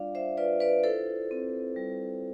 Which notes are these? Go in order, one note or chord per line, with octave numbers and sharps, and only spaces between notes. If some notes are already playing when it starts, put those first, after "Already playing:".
Already playing: G3 D4 F4 D5 F5
C5 E5
F4 B4 D5
B4 D5
E4 A4 C5
C4
G3